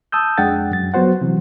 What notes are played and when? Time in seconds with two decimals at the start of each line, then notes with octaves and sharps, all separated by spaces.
0.12 A5 D#6 E6 G6
0.38 F2 G#3 D4 F#5 G5 A6
0.71 F#2 A6
0.94 F#3 B3 F#4 C5 F#5
1.21 C3 E3 F#3